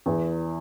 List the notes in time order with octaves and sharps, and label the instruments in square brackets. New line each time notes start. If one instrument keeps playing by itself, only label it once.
[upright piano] E2